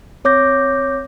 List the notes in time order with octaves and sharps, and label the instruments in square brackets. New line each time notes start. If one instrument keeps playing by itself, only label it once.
[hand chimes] C4 C#5 D6 G6 A#6